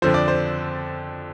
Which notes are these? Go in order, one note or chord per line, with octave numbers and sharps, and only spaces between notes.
F2 D3 F3 C5
D5
C5